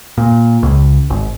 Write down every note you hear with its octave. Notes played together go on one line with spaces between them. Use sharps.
A#2
C#2
G#1